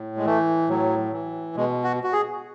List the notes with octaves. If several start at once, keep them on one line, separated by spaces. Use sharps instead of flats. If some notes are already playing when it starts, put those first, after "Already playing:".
Already playing: A2
G#3
E3 A3
A2 F#3
E3
B2 G#3
F#4
F#4
G#4